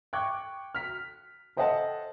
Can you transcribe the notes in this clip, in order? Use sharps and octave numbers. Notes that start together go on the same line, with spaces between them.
G5 C#6 D6 F#6 G#6
F6 B6
A4 C5 D#5 E5 F#5 A5